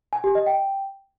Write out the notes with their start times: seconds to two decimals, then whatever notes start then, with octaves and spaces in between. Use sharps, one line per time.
0.13 G#5
0.24 G4
0.35 D#5
0.46 G5